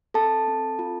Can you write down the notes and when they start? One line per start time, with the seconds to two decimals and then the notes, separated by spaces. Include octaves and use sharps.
0.14 C4 A4 A5
0.47 C4
0.79 F4